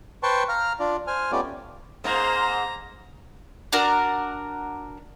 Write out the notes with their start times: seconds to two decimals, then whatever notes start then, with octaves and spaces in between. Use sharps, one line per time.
0.23 B4 C5 G5 A5 C6 C#6
0.49 F5 A#5 F6
0.80 D4 F4 D5
1.07 C5 G#5 F6
1.32 A3 B3 C#4 F4 G4 D5
2.04 G#2 A#3 C5 A#5
3.73 D4 F#4 A#4 A#5